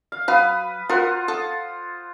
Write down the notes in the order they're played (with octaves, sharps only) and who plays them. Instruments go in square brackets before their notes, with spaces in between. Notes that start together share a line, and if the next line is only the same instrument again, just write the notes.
[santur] F5
[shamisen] F#3 F5 [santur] B4 B5 D#6
[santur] F4 C5 F#5 [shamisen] F#4 A#4
[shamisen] A4 [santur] D#6